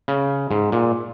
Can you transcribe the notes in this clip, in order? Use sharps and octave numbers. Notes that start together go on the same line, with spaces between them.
C#3
G#2
A#2